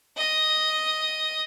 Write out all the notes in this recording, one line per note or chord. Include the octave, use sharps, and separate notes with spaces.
D#5 D#6